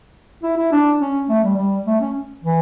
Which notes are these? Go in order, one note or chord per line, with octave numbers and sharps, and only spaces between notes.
E4
E4
D4
C#4
A3
G3
G3
A3
C#4
E3